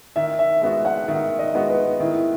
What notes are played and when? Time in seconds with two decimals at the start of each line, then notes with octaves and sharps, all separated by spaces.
0.16 D#3 E5
0.39 E5
0.62 G#3 B3 F#4 E5
0.85 F#5
1.08 D#3 E5
1.39 D#5
1.54 G#3 B3 F#4
1.70 B4
2.00 D#3 E4